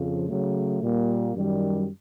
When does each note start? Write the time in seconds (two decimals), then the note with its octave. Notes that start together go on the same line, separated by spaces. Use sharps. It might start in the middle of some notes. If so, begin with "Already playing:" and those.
Already playing: F2 C#3 F3
0.28 C#3 F#3 A3
0.81 A#2 G3 A#3
1.35 F#2 D#3 G3